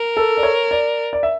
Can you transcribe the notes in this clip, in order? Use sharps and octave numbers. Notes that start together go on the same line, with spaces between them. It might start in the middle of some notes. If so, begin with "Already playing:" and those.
Already playing: A#4
A4
D5
C#5
D5
D5
E5